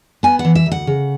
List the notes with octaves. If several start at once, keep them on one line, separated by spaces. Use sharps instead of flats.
B3 G#5
F#5
E3
E5
D2
F#5
C#3